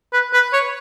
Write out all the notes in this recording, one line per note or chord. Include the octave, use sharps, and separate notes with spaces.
B4
B4
C#5